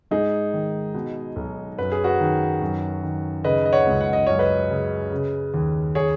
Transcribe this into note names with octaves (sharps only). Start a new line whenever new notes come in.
G#2 D#4 G#4
D#3
B2
B1
F#2 B4
G#4
F#4 B4
D#3
F#2
D#3
C#3 B4 D#5
D#5
C#5 F#5
C#2
F#5
D#5
F#2 C#5
B4 D#5
C#3
C#3
D#2
G#4 C#5